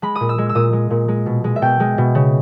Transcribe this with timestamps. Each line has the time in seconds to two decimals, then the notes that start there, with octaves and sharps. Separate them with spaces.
0.02 G#3 B5
0.15 A#2 D#6
0.29 E6
0.38 G#3
0.49 E6
0.55 A#2 D#6
0.73 G#3
0.90 A#2
1.08 G#3
1.26 B2
1.44 G#3
1.56 E5
1.62 B2 G5
1.80 G#3
1.98 B2
2.15 C#3